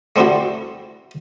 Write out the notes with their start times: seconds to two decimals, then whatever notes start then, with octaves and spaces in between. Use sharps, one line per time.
0.16 A3 C4 D4 E4 F#4 G4